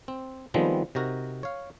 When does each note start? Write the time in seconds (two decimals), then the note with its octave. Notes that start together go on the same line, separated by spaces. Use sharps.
0.08 C4
0.54 D#3 F3 G3 G#3 B3 C4
0.95 C3 D#4 F#4 A#4
1.43 C#5 F5